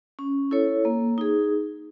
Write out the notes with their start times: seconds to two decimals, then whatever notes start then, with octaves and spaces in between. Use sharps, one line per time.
0.19 C#4
0.51 E4 A4 C#5
0.85 A#3
1.18 D#4 G#4